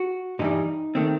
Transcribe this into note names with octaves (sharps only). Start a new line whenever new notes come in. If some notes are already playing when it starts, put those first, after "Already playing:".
Already playing: F#4
G2 E3 G3 D#4
D#3 A3 C4